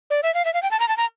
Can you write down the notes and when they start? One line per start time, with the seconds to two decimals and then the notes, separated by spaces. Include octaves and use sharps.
0.10 D5
0.23 E5
0.34 F5
0.45 E5
0.54 F5
0.62 G5
0.71 A5
0.80 A#5
0.88 A5
0.97 A#5